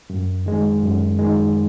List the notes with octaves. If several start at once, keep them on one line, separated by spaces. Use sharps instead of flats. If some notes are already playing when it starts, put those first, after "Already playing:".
F#2
D#3 G#3
F#2
D#3 G#3